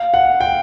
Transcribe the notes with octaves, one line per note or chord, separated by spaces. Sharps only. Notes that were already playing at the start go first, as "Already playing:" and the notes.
Already playing: F5
F#5
G5